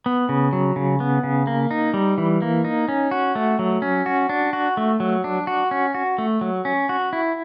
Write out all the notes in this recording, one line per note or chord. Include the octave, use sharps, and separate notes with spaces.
B3
C#3
F#3
C#3
B3
C#3
A#3
D#4
G3
E3
A#3
D#4
C#4
F#4
A3
F#3
C#4
F#4
D4
F#4
A3
F#3
D4
F#4
C#4
F#4
A3
F#3
C#4
F#4
E4